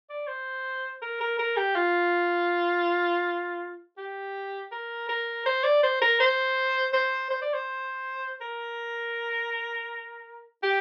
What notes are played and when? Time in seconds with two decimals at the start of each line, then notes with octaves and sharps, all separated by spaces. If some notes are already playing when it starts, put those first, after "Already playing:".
0.10 D5
0.27 C5
1.02 A#4
1.21 A#4
1.39 A#4
1.56 G4
1.75 F4
3.97 G4
4.72 A#4
5.09 A#4
5.46 C5
5.64 D5
5.83 C5
6.02 A#4
6.20 C5
6.93 C5
7.30 C5
7.42 D5
7.54 C5
8.41 A#4
10.63 G4